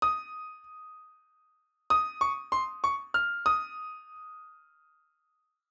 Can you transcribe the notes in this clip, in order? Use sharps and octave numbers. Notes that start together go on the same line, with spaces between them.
D#6
D#6
C#6
C6
C#6
F6
D#6